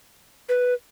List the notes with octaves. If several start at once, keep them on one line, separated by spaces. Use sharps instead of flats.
B4